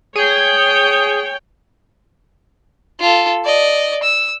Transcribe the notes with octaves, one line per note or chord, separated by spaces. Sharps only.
G#4 C#5 G5
F4 A4
D5 D#5
E6